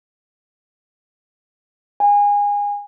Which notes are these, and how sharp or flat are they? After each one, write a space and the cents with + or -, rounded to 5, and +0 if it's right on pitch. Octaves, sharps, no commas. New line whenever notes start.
G#5 -25